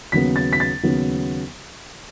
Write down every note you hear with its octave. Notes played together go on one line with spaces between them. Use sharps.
D#2 C#3 F#3 B3 B6
A6
B6
A6
D#2 C#3 F#3 B3